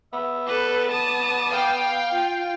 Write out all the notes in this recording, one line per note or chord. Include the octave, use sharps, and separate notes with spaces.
B3 E5
A4 B4 D5
A5 D#6
F5 G5
F4